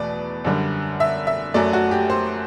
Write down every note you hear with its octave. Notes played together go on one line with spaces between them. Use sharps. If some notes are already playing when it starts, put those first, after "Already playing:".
Already playing: E2 B2 A3 B4 D5
F#2 D3 G3
E5
E5
F#2 F#3 A3 D5
F#4
G4
C5